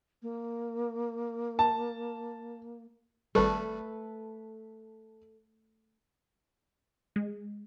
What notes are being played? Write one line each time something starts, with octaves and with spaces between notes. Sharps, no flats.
A#3
A5
G#1 G3 A3 A4 B4
G#3